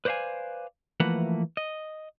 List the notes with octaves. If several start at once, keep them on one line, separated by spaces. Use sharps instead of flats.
B4 C5 D5 E5 F5 G#5
E3 F3 A3 A#3 B4 F#5
D#5